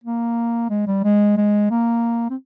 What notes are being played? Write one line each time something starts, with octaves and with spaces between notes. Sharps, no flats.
A#3
G#3
G3
G#3
G#3
A#3
C4